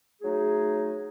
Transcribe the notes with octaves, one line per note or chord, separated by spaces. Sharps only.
F#3 A3 D#4 G#4